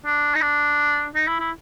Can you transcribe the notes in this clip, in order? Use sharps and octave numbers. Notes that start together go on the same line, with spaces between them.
D4
D#4
D4
D#4
E4
E4